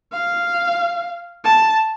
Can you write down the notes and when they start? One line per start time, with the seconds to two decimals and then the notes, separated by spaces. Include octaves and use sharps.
0.13 F5
1.44 A5